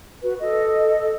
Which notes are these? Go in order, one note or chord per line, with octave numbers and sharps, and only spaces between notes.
F#4 B4
A4 D#5